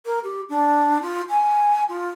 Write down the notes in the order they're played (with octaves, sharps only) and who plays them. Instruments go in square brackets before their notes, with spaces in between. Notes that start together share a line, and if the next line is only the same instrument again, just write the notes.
[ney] A#4
G4
D4
F4
G#5
F4